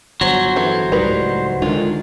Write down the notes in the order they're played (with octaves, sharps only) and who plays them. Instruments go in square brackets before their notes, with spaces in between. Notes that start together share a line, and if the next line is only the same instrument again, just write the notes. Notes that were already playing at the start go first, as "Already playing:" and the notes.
[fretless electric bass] G1 [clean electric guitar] F#3 [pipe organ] C5
[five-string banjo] E3 A4
[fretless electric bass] C#2 A2 G3 [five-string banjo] D#4 A#4 B4
[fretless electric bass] D3 D#3 [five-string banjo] G#3 F4